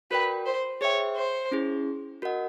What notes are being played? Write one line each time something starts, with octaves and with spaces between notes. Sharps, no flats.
F#4 A#4 B4 D5 G5
C5
G#4 C5 C#5 E5 G5
C5
C#4 E4 G#4
F#4 A#4 D#5 F#5